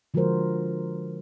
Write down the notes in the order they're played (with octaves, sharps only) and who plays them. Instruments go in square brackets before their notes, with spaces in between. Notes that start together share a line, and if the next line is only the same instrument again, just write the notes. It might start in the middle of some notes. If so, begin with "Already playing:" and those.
[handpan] D3 F3 G#3 F#4 A#4 C5